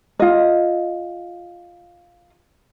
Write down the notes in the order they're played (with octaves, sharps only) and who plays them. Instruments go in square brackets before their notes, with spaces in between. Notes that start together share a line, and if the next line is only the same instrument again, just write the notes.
[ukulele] F4 D#5